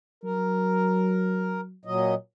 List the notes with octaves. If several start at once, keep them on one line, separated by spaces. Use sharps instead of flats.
F#3 A#4
A#2 F#3 D#5